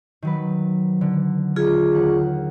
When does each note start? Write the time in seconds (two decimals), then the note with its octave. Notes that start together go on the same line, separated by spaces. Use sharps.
0.22 D#3 F#3 B4
1.01 D3
1.56 F4 G#4
1.93 D#2 C#4 F#5